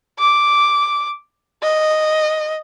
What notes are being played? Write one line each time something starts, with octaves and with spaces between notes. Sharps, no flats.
D6
D#5